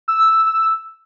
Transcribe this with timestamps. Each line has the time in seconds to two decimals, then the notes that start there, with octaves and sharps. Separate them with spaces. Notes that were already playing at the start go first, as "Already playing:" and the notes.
0.08 E6